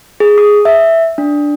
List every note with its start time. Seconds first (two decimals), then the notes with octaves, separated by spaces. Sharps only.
0.20 G#4
0.38 D#6
0.65 E5
1.18 D4